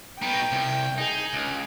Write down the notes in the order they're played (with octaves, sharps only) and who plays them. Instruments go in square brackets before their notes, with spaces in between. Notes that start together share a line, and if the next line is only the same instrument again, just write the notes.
[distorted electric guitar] B2 D#4 [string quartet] G5
[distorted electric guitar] C2
[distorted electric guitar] D#4 [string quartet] G#4
[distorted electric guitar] C#2